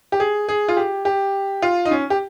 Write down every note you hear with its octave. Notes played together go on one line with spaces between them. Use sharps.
G4
G#4
G#4
F4
G4
G4
F4
D#4
C#4
G4